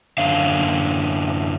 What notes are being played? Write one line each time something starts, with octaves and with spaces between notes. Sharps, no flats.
F#2 D3 F5